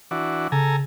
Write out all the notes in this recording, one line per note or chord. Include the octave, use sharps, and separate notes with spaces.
E3 D4 F#4
C#3 A4 G#5 A#5